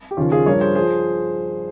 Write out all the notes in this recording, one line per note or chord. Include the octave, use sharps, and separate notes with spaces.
G4
D#2 C#3 F3 C#4 F4
F4 G#4
G2 F3 A#4 C#5
G#4 C5
F3 G#4 C5